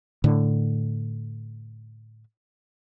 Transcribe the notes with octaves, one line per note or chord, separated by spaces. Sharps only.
A2 D3